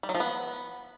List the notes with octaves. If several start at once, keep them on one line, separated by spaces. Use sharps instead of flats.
G3
F#3
F3
B3